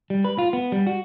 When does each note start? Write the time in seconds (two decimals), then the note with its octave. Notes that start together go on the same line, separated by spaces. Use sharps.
0.10 G3
0.24 B4
0.38 F4
0.53 B3
0.72 G3
0.87 F#4